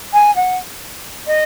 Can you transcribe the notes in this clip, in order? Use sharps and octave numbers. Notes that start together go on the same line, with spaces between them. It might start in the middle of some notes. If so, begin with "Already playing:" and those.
G#5
F#5
D#5